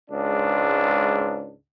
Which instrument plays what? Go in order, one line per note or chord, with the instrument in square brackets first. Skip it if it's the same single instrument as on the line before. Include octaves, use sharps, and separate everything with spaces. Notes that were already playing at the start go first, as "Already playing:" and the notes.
[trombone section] C#2 G#2 D4